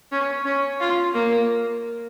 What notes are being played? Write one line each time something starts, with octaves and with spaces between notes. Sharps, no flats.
C#4
C#4
F4
A#3